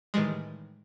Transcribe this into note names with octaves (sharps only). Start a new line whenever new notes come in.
A2 D#3 E3 G3 G#3